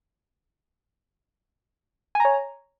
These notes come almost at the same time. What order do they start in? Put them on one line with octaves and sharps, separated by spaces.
G#5 A#5 C#5